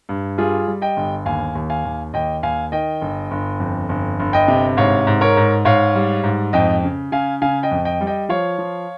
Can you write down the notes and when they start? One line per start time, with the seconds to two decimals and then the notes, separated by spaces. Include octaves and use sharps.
0.09 G2
0.38 G3 F4 G#4
0.68 G3
0.82 D#5 G5
0.97 G1
1.26 D#2 F5 G#5
1.55 D#2
1.70 F5 G#5
1.85 D#2
2.13 D#2 D#5 G5
2.43 D#2 F5 G#5
2.72 D#3 D#5 G5
3.02 G1
3.31 G1
3.60 F2
3.89 G1
4.20 G1
4.33 D#5 G5
4.48 C3
4.77 G#2 C#5 F5
5.07 G#2
5.21 A#4 C#5
5.37 G#2
5.65 G#2 C#5 F5
5.95 G3
6.24 G#2
6.53 F2 D#5 G5
6.83 C#3
7.12 C#3 F5 G#5
7.42 C#3 F5 G#5
7.63 D#5 G5
7.71 F2
7.85 D#5 G5
8.01 G3
8.07 D#5 G5
8.29 F3 C#5 F5
8.58 F3